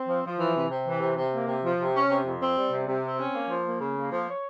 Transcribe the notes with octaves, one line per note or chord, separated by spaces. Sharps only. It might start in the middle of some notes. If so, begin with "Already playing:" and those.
Already playing: C4
F3
F3
E3
C3
C3
E3
C3
C3
A#3
C3
F3
C3
C#4
C3
F2
C4
G3
C3
C3
C4
C#4
A#3
F3
A#3
C#3
A#3
F3
C#5